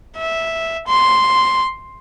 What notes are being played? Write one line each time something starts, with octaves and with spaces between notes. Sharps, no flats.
E5
C6